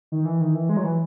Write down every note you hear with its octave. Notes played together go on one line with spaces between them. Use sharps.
D#3
E3
D#3
E3
G#3
F#3
E3